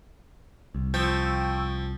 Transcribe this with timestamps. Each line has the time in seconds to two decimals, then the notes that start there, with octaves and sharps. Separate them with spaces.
0.75 C2
0.94 F3 G5 C#6 E6